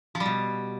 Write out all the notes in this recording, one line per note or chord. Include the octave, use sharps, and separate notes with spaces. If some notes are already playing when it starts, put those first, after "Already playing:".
F3
G3
B2